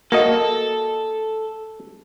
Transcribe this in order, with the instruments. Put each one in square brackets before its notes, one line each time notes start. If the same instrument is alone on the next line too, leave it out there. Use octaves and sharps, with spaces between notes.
[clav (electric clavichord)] A#3 F#4 D#5 [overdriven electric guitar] A4